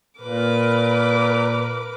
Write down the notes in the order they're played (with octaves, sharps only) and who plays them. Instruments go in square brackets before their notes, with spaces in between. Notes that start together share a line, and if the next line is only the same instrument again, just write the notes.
[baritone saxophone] A#2 [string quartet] A#4 B4 D6